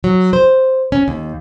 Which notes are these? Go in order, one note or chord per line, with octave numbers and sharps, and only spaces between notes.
F#3
C5
C#4
D#2